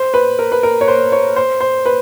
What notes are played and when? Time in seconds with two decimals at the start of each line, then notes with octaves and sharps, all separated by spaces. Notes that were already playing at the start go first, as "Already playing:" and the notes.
Already playing: C5
0.14 B4
0.39 A#4
0.52 B4
0.63 A#4
0.81 C#5
0.88 C5
1.12 C#5
1.36 C5
1.61 C5
1.86 B4